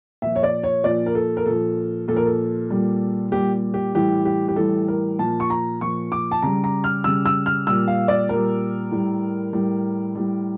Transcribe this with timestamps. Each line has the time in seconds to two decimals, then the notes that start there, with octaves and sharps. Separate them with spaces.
0.22 A#2 F3 E5
0.36 C#5
0.43 D5
0.63 C#5
0.84 A#2 F3 D5
1.06 A#4
1.15 A4
1.37 A#4
1.46 A#2 F3 A4
2.08 A#2 F3 A4
2.16 A#4
2.26 A4
2.70 A#2 G3
3.32 A#2 G3 G4
3.74 G4
3.95 A2 E3 G3 G4
4.25 G4
4.48 G4
4.56 A2 E3 G3 A4
4.88 A#4
5.19 A#2 F3 A5
5.40 C#6
5.50 A#5
5.81 A#2 F3 C#6
6.12 D6
6.31 A5
6.43 C#3 G3 A#5
6.64 A#5
6.84 F6
7.04 C#3 G3 E6
7.26 E6
7.46 F6
7.67 A#2 G3 E6
7.88 F5
8.08 D5
8.29 A#2 G3 A#4
8.91 A2 G3
9.53 A2 G3
10.15 A2 G3